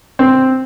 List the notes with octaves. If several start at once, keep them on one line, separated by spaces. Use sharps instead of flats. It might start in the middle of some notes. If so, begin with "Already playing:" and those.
C4